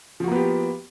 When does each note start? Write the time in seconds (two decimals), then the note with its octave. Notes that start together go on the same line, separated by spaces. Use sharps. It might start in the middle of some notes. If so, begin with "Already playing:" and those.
0.20 F3
0.24 F#4
0.28 A#3
0.32 B3
0.35 G4